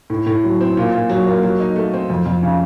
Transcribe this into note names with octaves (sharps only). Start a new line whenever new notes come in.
A2
A2
F#3
C4
A#2
A#2
F#3
A#3
F#3
D#4
A3
C4
F2
F2
C#3